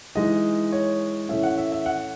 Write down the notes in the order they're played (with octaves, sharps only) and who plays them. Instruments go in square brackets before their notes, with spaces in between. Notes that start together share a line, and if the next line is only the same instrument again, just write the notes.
[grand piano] E3 G#3 D#4 D#5
C#5
A2 E3 A3 C#4 E5
F#5
E5
E5
F#5